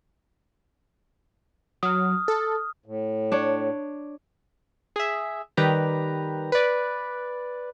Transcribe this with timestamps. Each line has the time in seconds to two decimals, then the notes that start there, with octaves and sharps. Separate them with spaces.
1.83 F#3 D#6 F6
2.28 A4
2.86 A2
3.32 D4 C#5
4.96 G#4 E5
5.57 D#3 G3 G4 B4 A#5
6.52 B4 D5